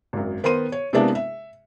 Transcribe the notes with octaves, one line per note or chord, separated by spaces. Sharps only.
G#1 F#2
D#3 B3 A#4 C5 C6 D#7
C#5
C3 G#3 A#3 B3 D4 E4
E5